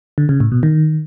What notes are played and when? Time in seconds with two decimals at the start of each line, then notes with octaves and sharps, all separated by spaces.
0.18 D3
0.29 C#3
0.40 A2
0.52 B2
0.63 D#3